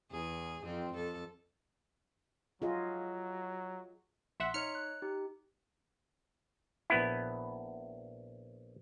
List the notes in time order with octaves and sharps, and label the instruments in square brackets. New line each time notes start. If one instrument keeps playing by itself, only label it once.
[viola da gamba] E2 G#4
F2 C4
F2 A4
[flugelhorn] F#3 [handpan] F4 G#4 D#5
[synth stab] A#1 E5 F#5 [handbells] C6 B6
[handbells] D#4 C#5 D#5 [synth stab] F6 C#7
[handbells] F#6
D#4 G4
[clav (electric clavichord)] A#1 B3 E4